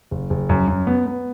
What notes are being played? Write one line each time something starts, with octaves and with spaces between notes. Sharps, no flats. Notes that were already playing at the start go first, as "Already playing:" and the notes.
F#1
F#1
F#2
F#2
B3
B3